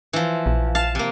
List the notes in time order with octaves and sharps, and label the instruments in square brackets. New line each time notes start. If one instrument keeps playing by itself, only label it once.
[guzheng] E3 F3
[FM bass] A#1
[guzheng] F5 A5
C3 A#3